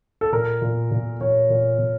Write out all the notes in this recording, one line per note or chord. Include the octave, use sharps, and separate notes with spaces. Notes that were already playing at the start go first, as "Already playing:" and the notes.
A4
A#2 A#4
A#2
A#2
A#2 C#5
A#2
A#2